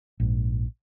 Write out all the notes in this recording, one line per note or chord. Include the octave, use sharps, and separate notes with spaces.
A#1 G#2